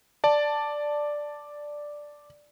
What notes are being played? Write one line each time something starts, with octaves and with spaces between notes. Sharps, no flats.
D5 A5